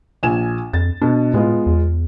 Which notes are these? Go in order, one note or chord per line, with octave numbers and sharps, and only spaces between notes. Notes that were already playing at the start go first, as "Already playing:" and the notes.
A#1 G#5 E7
F2 A6
B2 D4
A2 G#3 B3 F4
E2